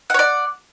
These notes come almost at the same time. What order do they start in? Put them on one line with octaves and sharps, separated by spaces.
F#5 C#5 D5